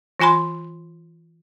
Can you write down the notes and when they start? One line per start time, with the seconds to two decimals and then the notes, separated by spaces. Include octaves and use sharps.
0.20 E3 F4 G#5 B5 C6